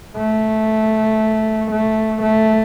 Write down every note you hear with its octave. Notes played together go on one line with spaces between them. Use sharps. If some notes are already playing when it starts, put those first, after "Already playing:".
A3
A3
A3